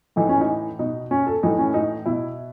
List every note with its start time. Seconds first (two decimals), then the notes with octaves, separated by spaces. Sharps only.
0.16 A2 E3 D#4
0.29 C#4
0.41 D#4
0.79 B2 D#4
1.11 C#4
1.27 A4
1.43 A2 E3 D#4
1.58 C#4
1.74 D#4
2.06 B2 E4